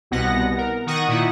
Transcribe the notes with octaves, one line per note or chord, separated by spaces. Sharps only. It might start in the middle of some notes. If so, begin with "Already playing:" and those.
C2 B2 B3 F#5 A#6
A#4
D#3 F#5 C#6 D#6 A#6 D#7
A#2 D#3 E4 F#5